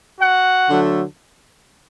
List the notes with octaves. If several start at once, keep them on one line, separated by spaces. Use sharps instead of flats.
F#4 F#5
D3 F#3 A3